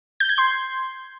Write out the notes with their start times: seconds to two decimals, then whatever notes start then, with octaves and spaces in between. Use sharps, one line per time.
0.20 G6
0.29 G#6
0.38 C6